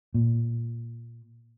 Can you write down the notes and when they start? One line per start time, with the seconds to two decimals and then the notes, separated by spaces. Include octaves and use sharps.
0.14 A#2